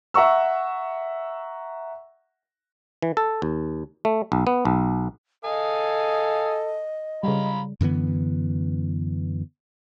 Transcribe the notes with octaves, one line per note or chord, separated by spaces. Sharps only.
E5 F#5 A#5 C#6 E6
E3
A4
D#2
A3
B1
B3
B1
A4 D#5 F5 G#5 D#6
C#3 G3 F4 A#5 B5
F#2 D3 E3 B3